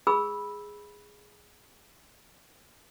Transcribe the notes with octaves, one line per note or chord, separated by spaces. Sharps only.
G#4 B5 E6